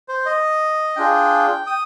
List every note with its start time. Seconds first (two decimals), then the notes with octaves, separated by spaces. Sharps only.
0.09 C5
0.26 D#5
0.96 D4 F4 G#4 G5
1.67 D#6